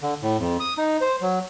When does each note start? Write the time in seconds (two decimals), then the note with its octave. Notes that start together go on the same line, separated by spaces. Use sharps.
0.01 D3
0.22 A2
0.39 F2
0.60 D#6
0.78 D#4
1.01 C5
1.22 F#3